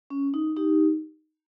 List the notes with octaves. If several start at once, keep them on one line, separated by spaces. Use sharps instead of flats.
C#4
D#4
D#4 G4